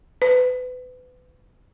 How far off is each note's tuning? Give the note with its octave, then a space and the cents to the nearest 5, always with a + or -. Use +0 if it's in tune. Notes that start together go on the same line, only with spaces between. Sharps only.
B4 +30